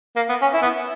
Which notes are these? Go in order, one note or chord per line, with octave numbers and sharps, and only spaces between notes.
A#3
B3
C#4
E4
B3